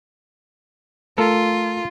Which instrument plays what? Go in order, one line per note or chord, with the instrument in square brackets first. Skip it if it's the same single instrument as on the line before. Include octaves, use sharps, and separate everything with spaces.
[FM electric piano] A3 [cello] F4 [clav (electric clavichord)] A4 A#4